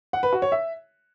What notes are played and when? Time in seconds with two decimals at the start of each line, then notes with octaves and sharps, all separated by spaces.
0.13 F#5
0.23 B4
0.33 F#4
0.42 C#5
0.52 E5